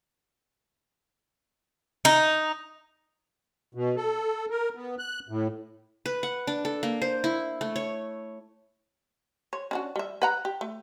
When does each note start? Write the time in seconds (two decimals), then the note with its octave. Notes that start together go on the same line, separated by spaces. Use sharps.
2.05 D#4
3.75 B2
3.96 A4
4.50 A#4
4.75 B3
4.99 F#6
5.29 A2
6.06 B4
6.23 F#5
6.47 D4
6.65 A4
6.83 A#3
7.02 C5
7.24 E4
7.61 A3
7.76 C#5
9.53 C#5
9.71 C#4 D4 F#4
9.96 G3 E5
10.22 B4 F#5 A#5
10.45 G4
10.61 A3